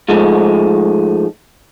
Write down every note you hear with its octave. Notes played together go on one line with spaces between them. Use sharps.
G#2 F3 G#3 A3